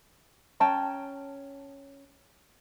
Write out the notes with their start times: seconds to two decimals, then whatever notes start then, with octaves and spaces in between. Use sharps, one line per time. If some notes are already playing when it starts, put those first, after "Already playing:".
0.60 C#4 G5 A5 A#5